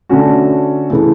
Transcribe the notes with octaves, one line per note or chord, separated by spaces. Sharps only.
D3 A3 C#4 F#4
C#3 E3 A3